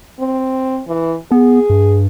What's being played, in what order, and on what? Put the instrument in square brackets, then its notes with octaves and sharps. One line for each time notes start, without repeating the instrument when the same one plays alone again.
[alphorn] C4
E3
[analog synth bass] B3 [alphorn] G#4
[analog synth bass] G2